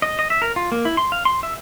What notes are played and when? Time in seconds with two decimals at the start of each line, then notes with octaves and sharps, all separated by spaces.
0.02 D#5
0.19 D#5
0.30 E5
0.42 A#4
0.56 F4
0.72 A#3
0.85 E4
0.97 C6
1.12 F5
1.25 C6
1.43 E5